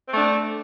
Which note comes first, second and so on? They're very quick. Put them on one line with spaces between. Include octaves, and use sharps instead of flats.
C4 A3 D4